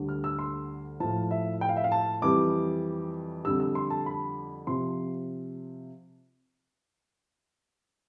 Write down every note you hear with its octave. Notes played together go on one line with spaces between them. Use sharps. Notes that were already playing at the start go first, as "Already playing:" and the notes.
Already playing: D2 D3 G3
F6
E6
C6
A2 F3 A5
E5
G5
F5
E5
F5
A5
F2 E3 G3 D6
F2 D3 G3 E6
E6
C6
A5
B5
C3 F3 C6